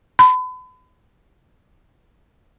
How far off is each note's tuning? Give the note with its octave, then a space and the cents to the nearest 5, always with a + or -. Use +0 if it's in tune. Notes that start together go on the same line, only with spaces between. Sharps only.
B5 +40